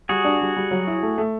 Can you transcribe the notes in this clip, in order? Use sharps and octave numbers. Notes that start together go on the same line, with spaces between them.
G3 F#4 G#4
D4
G3
G3
F#3
E4
A3
A3